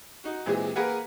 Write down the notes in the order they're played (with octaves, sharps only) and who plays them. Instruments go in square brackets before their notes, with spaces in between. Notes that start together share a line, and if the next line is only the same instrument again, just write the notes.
[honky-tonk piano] D#4 F#4
A#2 E3 G#3 C4 G4 G#4
A#3 G#4 A#4 B4 F#5